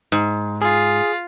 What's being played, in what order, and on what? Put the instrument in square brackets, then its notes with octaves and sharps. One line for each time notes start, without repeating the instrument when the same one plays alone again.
[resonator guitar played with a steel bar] G#2
[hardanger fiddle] F4 [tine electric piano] G#4